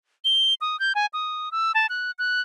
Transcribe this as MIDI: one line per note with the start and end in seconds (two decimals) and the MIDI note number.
0.25 0.54 103
0.61 0.79 87
0.80 0.93 91
0.95 1.06 80
1.13 1.52 87
1.52 1.72 88
1.75 1.87 81
1.89 2.11 90
2.19 2.41 90